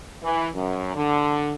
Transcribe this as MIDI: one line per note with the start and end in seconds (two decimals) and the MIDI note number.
0.24 0.49 52
0.55 0.94 42
0.95 1.54 50